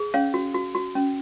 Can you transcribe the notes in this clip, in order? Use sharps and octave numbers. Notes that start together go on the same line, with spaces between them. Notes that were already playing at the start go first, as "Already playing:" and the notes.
Already playing: G#4
C#4 C#5 F5
F#4
F#4
F#4
C#4